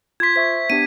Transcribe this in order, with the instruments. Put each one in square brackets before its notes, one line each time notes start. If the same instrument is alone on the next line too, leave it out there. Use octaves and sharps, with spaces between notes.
[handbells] F4 C6 [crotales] G#6 B6
[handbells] C5 E5 C#6 [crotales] B6
[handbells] B3 D4 G4 [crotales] D#7